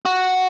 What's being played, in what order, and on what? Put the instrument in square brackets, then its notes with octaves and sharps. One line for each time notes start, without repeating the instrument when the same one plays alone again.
[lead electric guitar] F#4